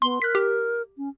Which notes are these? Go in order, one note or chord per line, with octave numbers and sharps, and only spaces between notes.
B3 C6
A#4 F#6 B6
G4
C#4